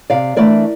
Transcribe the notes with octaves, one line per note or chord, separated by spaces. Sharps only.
C3 D5 F5
E3 A3 D4 A#4 D5